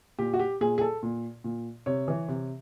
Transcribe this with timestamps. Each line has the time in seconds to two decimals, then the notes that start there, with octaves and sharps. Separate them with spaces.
0.19 A#2 G4
0.34 F#4
0.39 G4
0.61 A#2 G#4
0.78 G#4
0.81 A4
1.03 A#2
1.44 A#2
1.86 C3 C#5
2.08 E3
2.28 C3